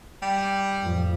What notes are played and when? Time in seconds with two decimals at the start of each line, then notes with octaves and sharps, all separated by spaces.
0.22 G3
0.79 F2 A2 F3